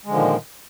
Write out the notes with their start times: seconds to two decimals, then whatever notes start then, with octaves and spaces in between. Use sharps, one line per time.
0.05 G#3
0.08 D3
0.10 F3
0.13 D#3
0.16 A#2